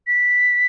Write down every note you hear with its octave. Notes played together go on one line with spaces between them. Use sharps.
B6